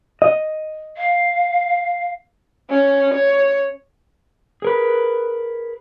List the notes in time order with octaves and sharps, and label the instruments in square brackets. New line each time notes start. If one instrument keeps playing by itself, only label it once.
[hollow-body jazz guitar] D#5
[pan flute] F5
[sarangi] C#4
C#5
[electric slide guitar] G#4 A#4 B4